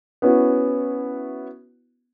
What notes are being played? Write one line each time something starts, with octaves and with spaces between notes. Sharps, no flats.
B3 C#4 E4 F#4